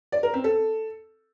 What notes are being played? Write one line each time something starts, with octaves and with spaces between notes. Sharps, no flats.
D5
A#4
C4
A4